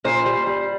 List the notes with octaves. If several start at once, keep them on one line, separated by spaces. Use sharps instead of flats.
A#2 C5
G3
G3